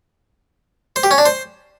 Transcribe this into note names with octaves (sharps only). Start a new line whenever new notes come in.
C5
G4
C#4
D4
C5